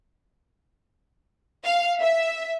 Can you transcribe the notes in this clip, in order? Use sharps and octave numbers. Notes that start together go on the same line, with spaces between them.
F5
E5